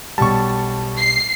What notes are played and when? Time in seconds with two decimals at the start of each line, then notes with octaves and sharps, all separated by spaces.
0.18 B1 G3 A5 C#6
0.97 C7